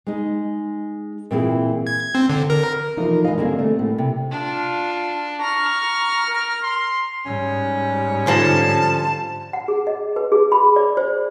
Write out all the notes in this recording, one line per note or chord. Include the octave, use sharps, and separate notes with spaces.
G#3 D#4
A#2 E3 C4 E4 F4 G#4
G#6
C4
D3
A#4
E3 F3 D#4 F4 A#4
E3 G#3 D#5 F5
D3 G3 A#3 C4 G#4 A#4
A3
A2
C3
D4 F4
A#5 C#6 F6
A#4
C6
G#2 G3 C#4
D3 F3 D#4 A5
F#5
G#4
D#5
B4
G#4
B5
D5
C5